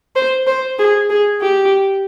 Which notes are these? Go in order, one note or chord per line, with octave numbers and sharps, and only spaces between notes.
C5
C5
G#4
G#4
G4